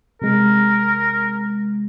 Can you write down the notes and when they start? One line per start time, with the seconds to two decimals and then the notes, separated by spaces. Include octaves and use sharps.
0.22 C3 G#3 A#4